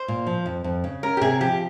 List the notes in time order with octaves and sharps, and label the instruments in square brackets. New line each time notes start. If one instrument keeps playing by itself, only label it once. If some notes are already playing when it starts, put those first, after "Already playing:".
Already playing: [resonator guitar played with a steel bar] C5
[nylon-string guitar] A#2
F3
F2
F2
C#3
[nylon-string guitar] C#4 [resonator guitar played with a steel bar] A#4
[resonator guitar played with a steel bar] G4
[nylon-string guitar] C3 [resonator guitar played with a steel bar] G#4
[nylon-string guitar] F3 [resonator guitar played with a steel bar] G4